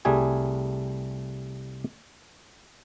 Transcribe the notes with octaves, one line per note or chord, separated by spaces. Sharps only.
C2 G3 A3 G#4 G#5